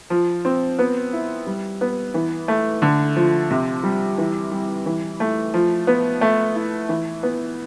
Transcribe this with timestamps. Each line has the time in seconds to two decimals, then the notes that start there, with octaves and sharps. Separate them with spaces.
0.10 F3
0.45 C4
0.79 B3
1.13 E4
1.47 G3
1.81 B3
2.14 E3
2.48 A3
2.82 D3
3.16 F3
3.51 C3
3.83 G3
4.18 E3
4.51 G3
4.86 E3
5.20 A3
5.54 F3
5.87 B3
6.21 A3
6.56 E4
6.89 E3
7.23 B3